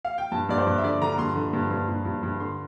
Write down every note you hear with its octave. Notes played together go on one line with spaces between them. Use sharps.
F5
G5
G2 A5
G2 D5
C5
G2
E5
D3 D5
D3 A#5
A#5
G2 C6
D3
G2
G2
G2
G2
G2
D3 C6